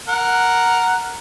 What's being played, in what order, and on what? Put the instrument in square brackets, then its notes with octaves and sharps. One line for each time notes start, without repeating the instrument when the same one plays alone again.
[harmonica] A#4 F#5